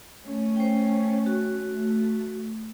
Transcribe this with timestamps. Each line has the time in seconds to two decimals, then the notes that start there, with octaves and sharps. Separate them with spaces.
0.26 A3 C#4
0.56 C5 G5
1.26 F#4
1.74 A3